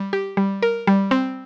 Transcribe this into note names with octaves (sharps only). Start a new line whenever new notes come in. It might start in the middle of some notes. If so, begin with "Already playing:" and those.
Already playing: G3
G4
G3
A#4
G3
C4